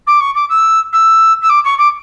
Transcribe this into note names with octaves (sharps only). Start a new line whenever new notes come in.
D6
C#6
D6
E6
E6
E6
D6
C#6
D6